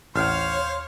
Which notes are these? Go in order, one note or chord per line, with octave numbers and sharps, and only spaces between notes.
A1 D#2 C5 C#5 F5 F6